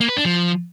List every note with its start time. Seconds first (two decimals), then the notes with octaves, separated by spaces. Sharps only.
0.01 A#3
0.09 B4
0.17 D4
0.25 F3